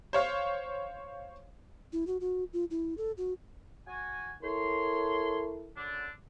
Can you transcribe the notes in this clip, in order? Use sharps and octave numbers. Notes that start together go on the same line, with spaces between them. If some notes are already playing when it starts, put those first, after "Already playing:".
C5 C#5 F5
E4
F#4
F#4
F4
E4
A4
F#4
F#4 G#5
E4 A4 A#4 C#5 C6
F#2 D3 D4